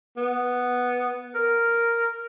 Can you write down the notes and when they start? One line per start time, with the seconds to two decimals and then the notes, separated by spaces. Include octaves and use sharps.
0.17 B3
1.35 A#4